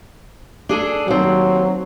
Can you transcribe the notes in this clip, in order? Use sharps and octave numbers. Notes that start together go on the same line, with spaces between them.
D4 G#4 A4
D#2 F#3 C4